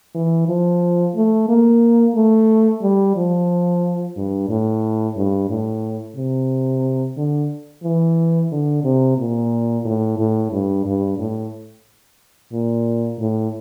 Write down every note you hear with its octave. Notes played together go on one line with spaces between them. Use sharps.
E3
F3
A3
A#3
A3
G3
F3
G2
A2
G2
A2
C3
D3
E3
D3
C3
A#2
A2
A2
G2
G2
A2
A#2
A2